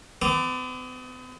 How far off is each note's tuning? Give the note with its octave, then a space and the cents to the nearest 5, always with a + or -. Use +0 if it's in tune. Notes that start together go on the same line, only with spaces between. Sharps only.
B3 +45 D6 +5